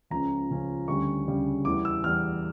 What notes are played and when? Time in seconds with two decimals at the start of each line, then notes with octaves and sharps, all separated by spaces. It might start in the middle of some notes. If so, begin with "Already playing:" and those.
0.10 C#2 C#3 F3 C#4 A#5
0.50 C#2 C#3 F3 C#4
0.88 D2 C#3 G3 C#4 C#6
1.26 D2 C#3 G3 C#4
1.65 E2 E3 G3 D6
1.85 E6
2.04 E2 E3 G3 F6